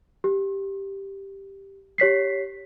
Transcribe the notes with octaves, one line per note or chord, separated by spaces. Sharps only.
G4
G4 C#5 B6 C7